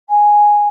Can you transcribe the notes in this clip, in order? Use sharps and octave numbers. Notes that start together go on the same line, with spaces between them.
G#5